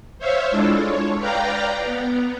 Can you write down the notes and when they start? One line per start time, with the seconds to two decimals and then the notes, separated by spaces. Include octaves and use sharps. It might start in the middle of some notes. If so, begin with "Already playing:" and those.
0.19 C5 C#5 E5 F5
0.51 G#3 D4 E4 F4 A4
0.85 C#5
1.18 B4 D5 F5 G5 A#5
1.85 B3